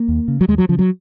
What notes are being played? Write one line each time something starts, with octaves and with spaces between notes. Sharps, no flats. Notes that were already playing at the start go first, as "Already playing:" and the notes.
Already playing: A#3
D#2
C#3
F#3
D#2 G#3
F#3
C#3 F3
F#3